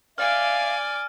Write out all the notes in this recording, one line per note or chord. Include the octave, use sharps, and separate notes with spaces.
D5 E5 F5 G#5 D6 F6